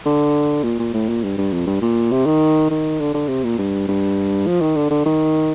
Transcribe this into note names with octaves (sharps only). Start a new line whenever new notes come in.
D3
A#2
A#2
A2
A#2
G2
G2
F2
G2
A#2
C3
D#3
D#3
D3
D3
C3
A#2
G2
G2
F3
D#3
D3
D3
D#3